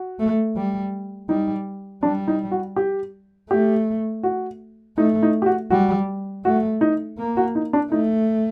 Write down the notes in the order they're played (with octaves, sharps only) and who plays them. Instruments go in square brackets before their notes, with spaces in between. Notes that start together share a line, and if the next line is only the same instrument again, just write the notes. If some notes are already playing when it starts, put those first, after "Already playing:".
Already playing: [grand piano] F#4
[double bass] A3
G3
[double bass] G3 [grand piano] D#4
[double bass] G3 [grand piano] D4
[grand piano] D#4
F#4
G4
[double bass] A3 [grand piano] G4
[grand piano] F#4
[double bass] A3 [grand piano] D#4
[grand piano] D#4
G4
F#4
[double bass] G3 [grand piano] F#4
[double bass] A3 [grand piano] F#4
[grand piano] D#4
[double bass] A#3
[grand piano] F#4
D#4
D4
[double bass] A3 [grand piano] D#4